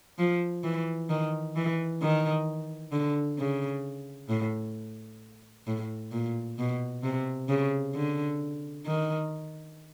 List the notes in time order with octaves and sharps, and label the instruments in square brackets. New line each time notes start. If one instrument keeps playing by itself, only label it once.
[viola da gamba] F3
E3
D#3
E3
D#3
D3
C#3
A2
A2
A#2
B2
C3
C#3
D3
D#3